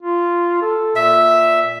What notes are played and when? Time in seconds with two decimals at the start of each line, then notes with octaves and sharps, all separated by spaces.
0.03 F4
0.62 A4
0.96 A#2 E5